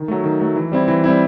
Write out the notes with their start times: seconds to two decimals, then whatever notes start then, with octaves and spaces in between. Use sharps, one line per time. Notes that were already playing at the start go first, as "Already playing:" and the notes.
Already playing: D#3
0.08 F#3 A3
0.24 D#3
0.40 F#3 A3
0.56 E3
0.72 G3 C4 E4
0.88 E3
1.04 G3 C4 E4